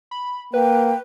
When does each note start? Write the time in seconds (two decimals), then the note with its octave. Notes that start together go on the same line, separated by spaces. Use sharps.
0.11 B5
0.54 A#3 B4 G5